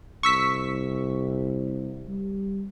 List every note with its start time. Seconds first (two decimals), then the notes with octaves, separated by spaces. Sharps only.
0.23 C2 C#6 E6 B6
2.08 G3